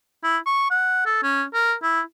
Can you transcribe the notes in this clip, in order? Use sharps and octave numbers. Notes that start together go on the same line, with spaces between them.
E4
C#6
F#5
A4
C#4
A#4
E4